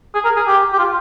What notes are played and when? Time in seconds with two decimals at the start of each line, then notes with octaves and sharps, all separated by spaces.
0.15 G#4
0.25 A#4
0.36 G#4
0.47 G4
0.73 G4
0.79 F4